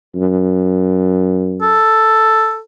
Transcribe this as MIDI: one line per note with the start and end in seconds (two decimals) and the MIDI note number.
0.15 1.79 42
1.62 2.59 69